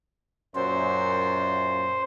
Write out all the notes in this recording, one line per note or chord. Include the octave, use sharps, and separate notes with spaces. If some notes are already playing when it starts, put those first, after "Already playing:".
F#2 A#2 C5